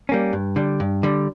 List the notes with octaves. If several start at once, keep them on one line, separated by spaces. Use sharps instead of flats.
G3 A#3 C#4
G2
D3 G3
G2
D3 G3